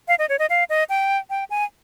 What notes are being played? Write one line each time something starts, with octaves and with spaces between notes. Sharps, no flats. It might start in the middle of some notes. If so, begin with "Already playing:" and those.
F5
D#5
C#5
D#5
F5
D#5
G5
G5
G#5